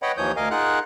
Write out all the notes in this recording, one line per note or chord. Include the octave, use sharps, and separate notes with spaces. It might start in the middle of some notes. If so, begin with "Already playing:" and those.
B4 C#5 D#5 F#5 G5 B5
D#2 E3 F3 C#5 D#6 G6
D2 A#4 D#5 F5 G#5
D#4 F4 G#4 A#4 F#5 F#6